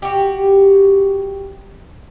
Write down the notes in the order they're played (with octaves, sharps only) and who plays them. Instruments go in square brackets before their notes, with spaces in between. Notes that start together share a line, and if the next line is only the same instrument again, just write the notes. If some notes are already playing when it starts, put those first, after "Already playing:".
[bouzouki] F#4 G4